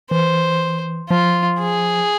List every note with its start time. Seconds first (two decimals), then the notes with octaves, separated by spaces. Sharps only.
0.11 E3 C5
1.10 F3 F4
1.60 G#4